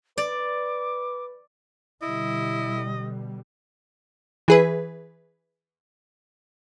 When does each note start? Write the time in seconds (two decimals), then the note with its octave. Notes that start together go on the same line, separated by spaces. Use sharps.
0.18 B4 D5 D6
2.02 B2 D3 G3 E4 D#5
4.48 E3 G#4 B4